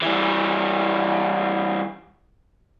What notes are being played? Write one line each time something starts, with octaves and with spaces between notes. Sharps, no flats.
E3 G3